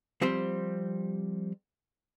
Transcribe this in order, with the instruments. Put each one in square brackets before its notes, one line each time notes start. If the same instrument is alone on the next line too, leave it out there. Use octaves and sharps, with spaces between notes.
[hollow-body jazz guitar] F3 G3 C4 G4 C5